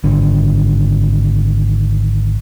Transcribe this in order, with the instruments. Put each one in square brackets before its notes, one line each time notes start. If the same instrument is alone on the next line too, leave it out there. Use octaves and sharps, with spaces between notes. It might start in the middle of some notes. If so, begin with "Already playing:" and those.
[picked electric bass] G#1 D3